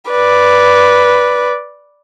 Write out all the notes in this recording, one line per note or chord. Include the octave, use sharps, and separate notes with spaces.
B4 D5